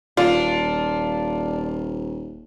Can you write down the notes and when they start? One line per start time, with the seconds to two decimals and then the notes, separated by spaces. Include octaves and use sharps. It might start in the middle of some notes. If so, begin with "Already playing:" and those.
0.17 D#1 D4 F4